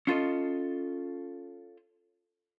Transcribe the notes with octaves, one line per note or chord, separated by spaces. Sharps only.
C#4 F4 A4 D#5